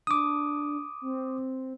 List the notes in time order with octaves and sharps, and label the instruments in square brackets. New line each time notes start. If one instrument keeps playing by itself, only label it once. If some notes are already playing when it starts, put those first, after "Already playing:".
[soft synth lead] D4 [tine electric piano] D6 D#6
[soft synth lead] C4